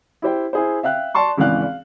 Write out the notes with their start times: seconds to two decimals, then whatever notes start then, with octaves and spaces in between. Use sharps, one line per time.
0.22 E4 G4 C5 G5
0.53 E4 G#4 C5
0.83 E5 F5 G5 F#6
1.15 D5 A5 C6 C#6
1.37 G#1 C#2 E3 D5 F5 F#6
1.62 F5